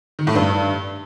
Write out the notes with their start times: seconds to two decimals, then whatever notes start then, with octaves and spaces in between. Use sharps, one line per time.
0.19 D#3
0.27 A2
0.35 G2